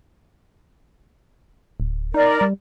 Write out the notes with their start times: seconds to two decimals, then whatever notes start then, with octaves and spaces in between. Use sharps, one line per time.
1.80 D1
2.14 D#4 A#4 D5
2.41 G3